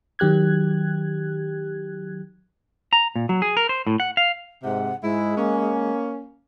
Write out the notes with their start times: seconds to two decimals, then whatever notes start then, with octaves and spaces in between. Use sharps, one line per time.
0.19 D#3 F#3 G4 F#6 G#6
2.93 A#5
3.16 A#2
3.29 F#3
3.42 G#4
3.57 A#4
3.69 C5
3.87 A2
4.00 F#5
4.17 F5
4.63 G#2 C3 F#5
5.02 G#2 G#3 E4
5.36 A#3 C#4